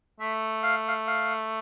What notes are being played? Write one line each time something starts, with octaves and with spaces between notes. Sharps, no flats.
A3 E5
F5
F5
F5